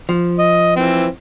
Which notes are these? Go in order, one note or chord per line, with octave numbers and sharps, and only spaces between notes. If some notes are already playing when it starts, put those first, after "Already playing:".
F3
D#5
E3 C4